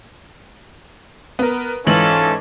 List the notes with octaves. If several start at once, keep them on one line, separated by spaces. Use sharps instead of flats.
B3 A#4
G#2 E3 C#4 F4 A4 F#7